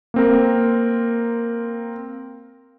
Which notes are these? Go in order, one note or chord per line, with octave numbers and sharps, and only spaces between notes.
A#3 C4 A#4